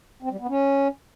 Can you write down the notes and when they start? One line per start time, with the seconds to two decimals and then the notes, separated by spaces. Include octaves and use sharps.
0.23 C4
0.31 G3
0.40 B3
0.49 C#4